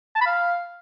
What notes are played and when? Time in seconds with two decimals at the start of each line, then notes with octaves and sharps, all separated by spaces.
0.15 A5
0.21 B5
0.26 F5